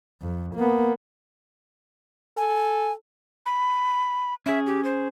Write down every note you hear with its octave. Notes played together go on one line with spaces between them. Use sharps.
F2
A#3 B3
A4 G#5
B5
C#4 G#4 E5
G4
C5